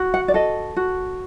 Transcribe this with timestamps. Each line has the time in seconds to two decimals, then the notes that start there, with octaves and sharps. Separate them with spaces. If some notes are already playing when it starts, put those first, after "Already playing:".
Already playing: F#4
0.14 F#5
0.28 D5
0.34 A4 D#5
0.76 F#4